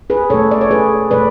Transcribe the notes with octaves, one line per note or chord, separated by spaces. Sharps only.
G#4 B4
B2 A3 A4 C#5
D5
C#5
G#4 B4
B2 A3 B4 D5